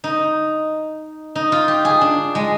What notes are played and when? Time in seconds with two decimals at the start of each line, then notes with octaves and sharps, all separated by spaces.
0.04 D#4
1.35 D#4
1.52 F4
1.68 G4
1.85 G#4
2.01 D4
2.35 G#3